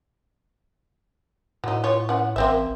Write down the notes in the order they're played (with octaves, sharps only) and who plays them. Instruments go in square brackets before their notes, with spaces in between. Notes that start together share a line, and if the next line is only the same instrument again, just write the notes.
[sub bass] A2 [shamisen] F#3 D#4
[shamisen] F4 C#5
C#4 F#5
[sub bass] A1 [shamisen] A#3 C4 E5